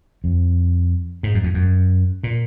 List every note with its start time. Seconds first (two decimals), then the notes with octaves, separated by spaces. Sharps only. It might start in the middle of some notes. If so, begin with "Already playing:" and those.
0.24 F2
1.23 G#2
1.34 F#2
1.44 F2
1.54 F#2
2.24 A#2